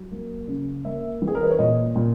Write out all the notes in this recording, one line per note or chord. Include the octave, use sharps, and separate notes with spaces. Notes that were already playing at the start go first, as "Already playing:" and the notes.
Already playing: F#3
A#3
C#3
A#3 E5
E3
G#4
A#4
B4
C#5
A#2 D#5
A#2